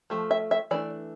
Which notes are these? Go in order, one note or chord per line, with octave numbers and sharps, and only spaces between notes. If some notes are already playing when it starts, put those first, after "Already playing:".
F3 A3
E5
E5
E3 A3 D4 D5